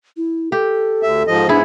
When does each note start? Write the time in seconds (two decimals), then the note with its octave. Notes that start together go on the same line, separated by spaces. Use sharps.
0.17 E4
0.52 G4 A4
1.03 D2 E5
1.27 G#2 F3 D#5
1.49 G#2 B3 D4 E4 G#4